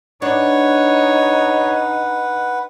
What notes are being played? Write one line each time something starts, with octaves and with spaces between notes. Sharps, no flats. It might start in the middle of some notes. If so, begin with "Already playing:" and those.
D4 D#4 B4 C#5 F#5